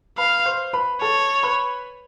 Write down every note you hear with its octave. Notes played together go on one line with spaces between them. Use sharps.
B4 F5 B5
C5 C6
B4 B5
A4 C#5 A5
B4 B5